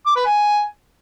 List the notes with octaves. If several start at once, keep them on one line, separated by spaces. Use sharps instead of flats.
D6
B4
G#5